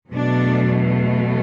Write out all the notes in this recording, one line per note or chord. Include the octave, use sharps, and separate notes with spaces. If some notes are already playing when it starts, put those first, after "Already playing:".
E2 B2 F#3 A3 D4